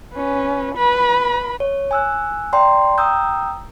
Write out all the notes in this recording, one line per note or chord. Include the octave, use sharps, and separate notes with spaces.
C#4 B4
B4 B5
C#5
G#5 E6 F#6
D5 G5 A#5 C6
G5 A#5 D#6 E6 G6